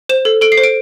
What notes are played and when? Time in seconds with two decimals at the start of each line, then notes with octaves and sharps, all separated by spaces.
0.09 C5 E7
0.25 A4
0.41 A4 D7
0.52 C7
0.58 C5
0.63 D7